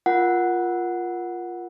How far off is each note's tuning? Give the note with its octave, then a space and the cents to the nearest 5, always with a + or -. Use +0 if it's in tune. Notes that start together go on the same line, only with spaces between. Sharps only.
F4 +0 A#4 +20 F#5 +0